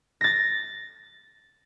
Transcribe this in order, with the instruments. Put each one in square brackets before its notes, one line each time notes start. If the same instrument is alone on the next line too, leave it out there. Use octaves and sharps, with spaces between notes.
[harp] A6 A#6